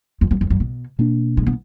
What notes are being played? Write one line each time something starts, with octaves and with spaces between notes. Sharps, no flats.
F2
F#2
F2
F#2
B2
B2 A#3 D4
G#3
B3